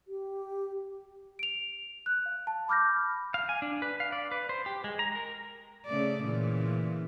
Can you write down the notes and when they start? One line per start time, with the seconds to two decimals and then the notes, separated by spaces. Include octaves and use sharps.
0.08 G4
1.39 D7 F7
2.06 F#6
2.26 F5
2.47 A5
2.68 B5 D6 F6 G6 A#6
3.34 F5
3.49 G#5
3.62 D4
3.82 B4
4.00 F5
4.12 D5
4.31 B4
4.49 C5
4.66 G4
4.84 G#3
4.99 A#5
5.15 A#4
5.86 C#3 A3 D5
6.24 A#2 C#3 E3